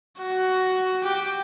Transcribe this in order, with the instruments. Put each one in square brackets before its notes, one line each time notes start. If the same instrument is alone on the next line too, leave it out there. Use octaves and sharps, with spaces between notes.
[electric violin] F#4
G4